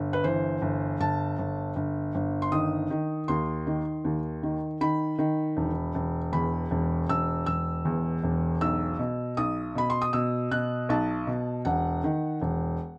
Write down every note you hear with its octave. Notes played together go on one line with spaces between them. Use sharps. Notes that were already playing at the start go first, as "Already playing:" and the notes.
Already playing: G1
B4
E3 C5
G1
G1 A5
G1
G1
G1
C6
D#3 D#6
D#3
D#2 C6
D#3
D#2
D#3
D#3 B5
D#3
E1
E1
E2 B5
E1
E1 E6
E1 E6
E2
E1
B1 E6
B2
B1 D#6
B2 B5
C6
D#6
B2 E6
B2 F#6
B1 A5
B2
E1 F#5
D#3
E1